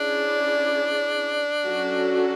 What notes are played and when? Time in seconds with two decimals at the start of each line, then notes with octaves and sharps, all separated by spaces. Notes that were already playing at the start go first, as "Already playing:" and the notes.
Already playing: C#4 D4 E4 G#4 D5
1.65 F#3 C#4 F#4 A4